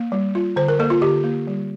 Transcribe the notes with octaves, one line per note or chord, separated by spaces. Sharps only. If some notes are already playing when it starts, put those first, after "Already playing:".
Already playing: A#3
G3
F4
D3 C5
A#4
A#3 A4
F4
D3 G4
A#3
G3